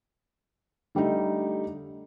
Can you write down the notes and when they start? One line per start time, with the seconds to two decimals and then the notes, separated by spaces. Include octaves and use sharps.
0.95 D3 G3 A3 D#4